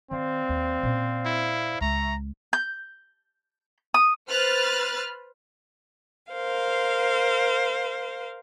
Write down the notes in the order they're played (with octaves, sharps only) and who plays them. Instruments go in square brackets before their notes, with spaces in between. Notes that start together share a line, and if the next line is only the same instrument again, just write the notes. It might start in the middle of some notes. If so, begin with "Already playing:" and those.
[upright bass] D#3 [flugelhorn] C4 [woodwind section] C5 D5 F5
[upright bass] D#2 D#3
A#2 C#4
[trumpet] E4
[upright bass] C#2 [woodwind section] E5 C#6 [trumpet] A#5
[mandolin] G6
D#6
[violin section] B4 C5 F6 F#6 A6
[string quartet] A#4 C5 F5